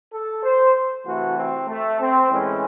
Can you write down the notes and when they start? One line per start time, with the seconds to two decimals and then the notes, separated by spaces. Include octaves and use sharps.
0.11 A4
0.43 C5
1.05 C3 E3 A3 F#4
1.36 C4
1.67 A3
1.99 C4
2.30 A2 E3 G#3 C#4